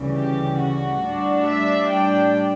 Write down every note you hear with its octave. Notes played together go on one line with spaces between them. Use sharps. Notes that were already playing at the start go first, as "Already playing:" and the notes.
Already playing: D2 C#3 E3 G3
G4
F#4
A2 G3 D4
E5
G5